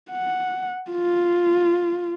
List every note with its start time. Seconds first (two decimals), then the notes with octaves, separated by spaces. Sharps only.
0.12 F#5
0.91 F4